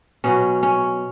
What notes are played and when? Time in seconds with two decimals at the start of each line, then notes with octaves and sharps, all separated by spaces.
0.24 B2 F#3 C#4
0.63 C#4